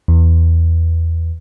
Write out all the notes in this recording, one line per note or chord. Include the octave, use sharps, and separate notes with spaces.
E2